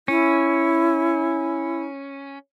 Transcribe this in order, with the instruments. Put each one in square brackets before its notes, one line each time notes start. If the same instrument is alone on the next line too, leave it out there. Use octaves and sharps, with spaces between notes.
[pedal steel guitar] C#4 [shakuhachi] E4